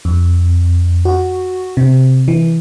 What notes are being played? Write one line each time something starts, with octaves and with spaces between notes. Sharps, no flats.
F2
F#4
C3
E3